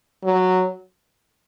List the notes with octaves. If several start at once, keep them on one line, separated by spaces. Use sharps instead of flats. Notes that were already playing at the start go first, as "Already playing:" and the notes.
F#3